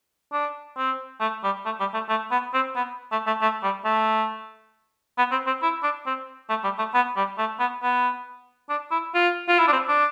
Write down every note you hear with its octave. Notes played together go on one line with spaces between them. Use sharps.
D4
C4
A3
G3
A3
G3
A3
A3
B3
C4
B3
A3
A3
A3
G3
A3
B3
C4
C4
E4
D4
C4
A3
G3
A3
B3
G3
A3
B3
B3
D4
E4
F4
F4
E4
D4
C4
D4